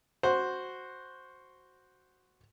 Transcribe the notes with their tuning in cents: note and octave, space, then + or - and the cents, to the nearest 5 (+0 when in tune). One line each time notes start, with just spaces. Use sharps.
F#4 +0 C5 +0